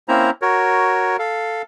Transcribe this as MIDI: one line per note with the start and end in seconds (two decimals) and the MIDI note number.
0.08 0.31 58
0.08 0.31 60
0.08 0.31 61
0.08 0.31 64
0.08 0.31 72
0.08 0.31 82
0.42 1.17 66
0.42 1.17 70
0.42 1.17 73
1.19 1.62 69
1.19 1.62 77